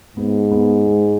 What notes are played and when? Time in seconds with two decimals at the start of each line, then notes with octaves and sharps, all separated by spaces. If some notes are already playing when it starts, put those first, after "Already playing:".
0.17 G#2 B3
0.52 B3
0.86 G#3